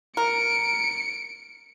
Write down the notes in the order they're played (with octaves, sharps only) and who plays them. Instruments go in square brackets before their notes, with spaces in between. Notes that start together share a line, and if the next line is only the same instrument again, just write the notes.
[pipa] A#4 [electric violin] C#7 D7